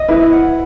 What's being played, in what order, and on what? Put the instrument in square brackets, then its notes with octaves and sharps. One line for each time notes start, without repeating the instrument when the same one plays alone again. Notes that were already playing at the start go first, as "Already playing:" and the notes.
Already playing: [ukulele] D#5
[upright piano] E4 [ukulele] B4
[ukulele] F#5